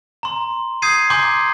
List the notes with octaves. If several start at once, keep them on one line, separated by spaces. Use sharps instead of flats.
A#5 C6
D#6 G6 G#6 C7 D#7
G#5 A#5 C6 D6 G6